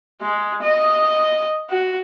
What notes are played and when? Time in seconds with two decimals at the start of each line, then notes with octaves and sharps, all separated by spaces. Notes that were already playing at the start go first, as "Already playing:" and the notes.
0.22 G#3
0.62 D#5
1.70 F#4